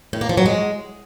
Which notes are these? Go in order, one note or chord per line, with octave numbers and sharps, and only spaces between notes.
A2
A#3
F3
F#3
G#3